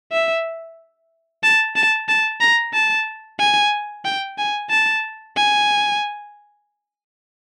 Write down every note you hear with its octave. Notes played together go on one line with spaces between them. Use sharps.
E5
A5
A5
A5
A#5
A5
G#5
G5
G#5
A5
G#5